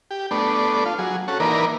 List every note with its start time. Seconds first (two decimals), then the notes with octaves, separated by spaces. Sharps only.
0.11 G4
0.31 A3 B3 D4
0.86 F4
0.99 F#3 G#4
1.28 C#4 F#4 A4
1.40 E3 A#3 D#4 A#4 B4 D5